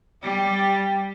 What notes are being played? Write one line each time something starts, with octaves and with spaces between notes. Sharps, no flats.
G3 G4